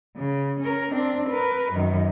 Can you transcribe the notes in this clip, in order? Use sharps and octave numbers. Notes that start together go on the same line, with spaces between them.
C#3
C#4 A#4
C4 D4
A#4 B4
F#2 D#3